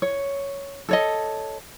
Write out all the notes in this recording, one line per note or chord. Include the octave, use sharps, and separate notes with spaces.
C#5
A4 C#5 D#5